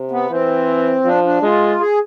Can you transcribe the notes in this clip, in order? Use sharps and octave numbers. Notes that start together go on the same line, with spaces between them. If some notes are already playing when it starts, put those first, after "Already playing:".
Already playing: C3
B3
E3 C4
F3 D4
D4
G#3 F4
G#4